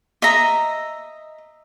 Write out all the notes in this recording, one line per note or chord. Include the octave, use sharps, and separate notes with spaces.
D#5 E5 A#5